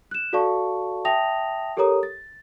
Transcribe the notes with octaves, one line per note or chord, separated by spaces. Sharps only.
F#6 E7
F#4 A4 D5 F5 A5 C#6
E5 G5 A5 D#6 A#6 F7
G4 A4 A#4 C#5 A#5 D#6
A6